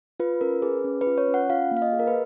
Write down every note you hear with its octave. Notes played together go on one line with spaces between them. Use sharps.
F4 B4
C#4 A#4
G#4 B4
C#4
B4
F4
C#5
C#4
F#5
F4 F5
A#3
F5
D#5
G#4
A#4
B4